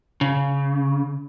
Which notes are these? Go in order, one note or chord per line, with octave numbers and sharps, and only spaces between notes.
C#3